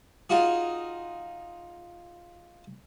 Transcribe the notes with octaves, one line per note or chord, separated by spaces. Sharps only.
D#4 F4 F#4 G#4